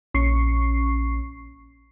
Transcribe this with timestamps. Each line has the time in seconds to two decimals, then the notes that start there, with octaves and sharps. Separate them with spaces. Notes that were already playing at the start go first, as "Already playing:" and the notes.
0.14 A#1 C#4 C#6 C7